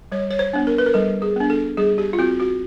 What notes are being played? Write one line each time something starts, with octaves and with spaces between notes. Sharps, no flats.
G3 C#5
C#5
C5
B3 D4
A#4
B4
A#4
G3 A4
G#4
B3 D4
A4
G3 G#4
G4
F4
C4 F#4
F#4